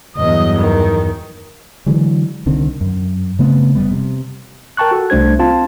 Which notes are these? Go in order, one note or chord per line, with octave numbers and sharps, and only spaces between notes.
E2 G2 F#3 D#5
D#3
D3 E3 F#3 G#3
C2 D3 D#3 C4
F#2
C#3 A3 B3 C4
F1 G3 B3
C3
A#4 G5 A5 C#6 F#6
F#4 A4
C2 A3 D4 C5 G#6
C4 F4 A5